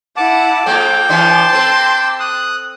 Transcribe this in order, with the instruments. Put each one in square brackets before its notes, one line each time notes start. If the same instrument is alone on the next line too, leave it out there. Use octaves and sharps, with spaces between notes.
[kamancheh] E4 F#5 [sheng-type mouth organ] A5 D6
[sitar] F3 G#3 A#3 [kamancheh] A4 [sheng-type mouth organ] G5 D6
[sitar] E3 C#4 D#4 [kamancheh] A5 C6
[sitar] C4 A4
[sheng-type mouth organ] D#6 F#6